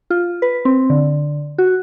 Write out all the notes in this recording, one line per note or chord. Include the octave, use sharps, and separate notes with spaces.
F4
B4
C4
D3
F#4